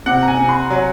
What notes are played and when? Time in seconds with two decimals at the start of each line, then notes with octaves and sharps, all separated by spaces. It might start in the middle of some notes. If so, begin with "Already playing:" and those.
0.06 C3 F#5
0.23 A#5
0.28 G#5
0.39 C3
0.49 C6
0.70 F#3